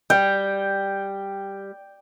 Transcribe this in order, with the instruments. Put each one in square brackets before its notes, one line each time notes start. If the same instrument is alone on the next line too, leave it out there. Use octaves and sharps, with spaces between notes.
[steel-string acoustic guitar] G3 [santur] G5